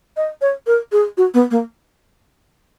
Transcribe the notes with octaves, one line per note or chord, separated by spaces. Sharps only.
D#5
C#5
A#4
G#4
F#4
B3
A#3